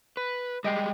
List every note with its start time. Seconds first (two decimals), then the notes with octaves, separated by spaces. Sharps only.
0.17 B4
0.64 G3 G#3 D#5 G5 C7